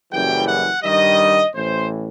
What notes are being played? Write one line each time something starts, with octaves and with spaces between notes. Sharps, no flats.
F#1 F#2 E3 G3 G5
F#5
G2 D#3 G3 D#5
A1 A2 E3 C5